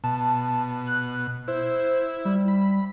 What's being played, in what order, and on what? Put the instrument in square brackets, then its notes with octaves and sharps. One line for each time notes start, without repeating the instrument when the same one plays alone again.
[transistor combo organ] B2 [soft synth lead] A5
[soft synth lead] F#6
[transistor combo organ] E4 [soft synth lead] C5
[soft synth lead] G3
[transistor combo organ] B5